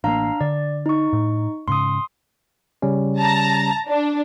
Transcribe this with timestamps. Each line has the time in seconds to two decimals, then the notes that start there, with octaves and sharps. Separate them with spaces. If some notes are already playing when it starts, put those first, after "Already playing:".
0.04 A1 A#3 D4 F5 A#5
0.41 D3 D5
0.86 D#4 C#6
1.13 A2
1.68 G#2 C#3 C6 D#6
2.82 C#3 G3 C#4
3.17 A5 A#5
3.87 D4